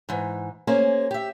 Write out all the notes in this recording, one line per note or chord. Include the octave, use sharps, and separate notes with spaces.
G#2 E3
A#3 C#4 G#4 C5
G4 E5